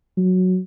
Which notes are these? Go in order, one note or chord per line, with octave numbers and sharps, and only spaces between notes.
F#3